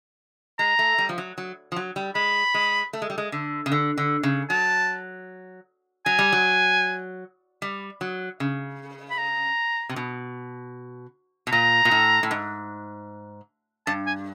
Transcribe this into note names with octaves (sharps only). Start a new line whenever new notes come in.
G#3 A#5
A3
G3
F3
F#3
F#3
F3
F#3
G3
G#3 B5
G#3
A3
G#3
G3
G#3
D3
C#3
D3
D3
C#3
F#3 A5
F#3 G#5
G3
F#3
G3
F#3
C#3
B5
A#5
C3
B2
B2
A#2 A#5
A#2
A2
A2
G#2
G2 A5
G#5